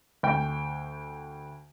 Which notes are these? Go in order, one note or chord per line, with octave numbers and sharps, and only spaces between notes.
D2 G5